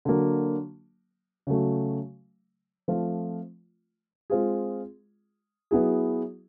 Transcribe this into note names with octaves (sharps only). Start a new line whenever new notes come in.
D3 F#3 A#3
C#3 F#3 A3
F3 A3 C4 F4
G#3 C4 F4 G#4
F#3 B3 E4 G#4